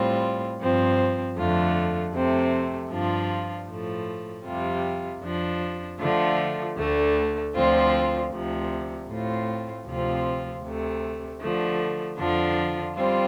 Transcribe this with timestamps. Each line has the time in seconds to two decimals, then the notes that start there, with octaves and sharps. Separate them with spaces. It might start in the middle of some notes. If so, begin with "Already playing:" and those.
Already playing: A2 G3 C4 F4
0.59 G2 F3 C4
1.36 F2 D3 A3 F4
2.13 F2 C3 A3 C4
2.91 G2 F3 D4 F4
3.68 A2 F3 A3
4.45 F2 C3 G3 F4
5.22 F2 F3 D4
5.99 D3 F3 A3 F4
6.77 D2 D3 A3
7.55 D2 D3 F3 C4 F4
8.31 D2 C3 F3
9.09 A2 A3 C4 F4
9.86 D2 C3 F3 C4 F4
10.64 D2 C3 A3
11.41 D3 F3 A3
12.18 F2 D3 F3 D4 F4
12.95 G3 C4 F4